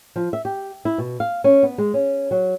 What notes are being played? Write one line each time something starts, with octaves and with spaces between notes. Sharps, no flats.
F3
E5
G4
E4
B2
F5
C#4
B3
G#3
C#4
F#3